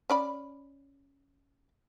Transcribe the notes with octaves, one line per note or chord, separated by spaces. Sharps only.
C#4 D5 B5